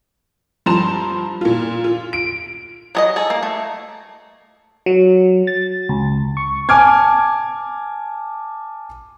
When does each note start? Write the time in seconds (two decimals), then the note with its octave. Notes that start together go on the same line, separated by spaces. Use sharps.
0.66 G2 F3 A5 A#5 C6 E7
1.41 A#2 F4
1.84 F4
2.13 D7
2.95 F#3 G#4 D#5
3.16 G#4 A4
3.30 A#3
3.43 A3
4.86 F#3
5.47 A6
5.89 C#2
6.37 C#6
6.69 G#5 A5 D6 F6 G#6